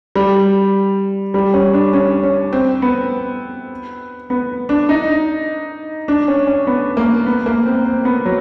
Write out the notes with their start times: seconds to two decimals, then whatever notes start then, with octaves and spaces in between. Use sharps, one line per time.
0.16 G3
1.34 G3
1.54 C#4
1.74 D4
1.93 C#4
2.23 C#4
2.53 C4
2.82 B3
4.30 B3
4.69 D4
4.89 D#4
6.08 D4
6.28 C#4
6.47 C#4
6.67 B3
6.97 A#3
7.26 B3
7.46 A#3
7.66 C4
7.85 C4
8.05 B3
8.25 F#3